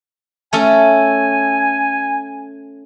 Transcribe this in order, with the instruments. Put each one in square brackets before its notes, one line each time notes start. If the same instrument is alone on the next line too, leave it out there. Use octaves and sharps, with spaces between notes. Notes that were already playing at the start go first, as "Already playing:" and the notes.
[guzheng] A3 C#4 A4 [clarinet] G#5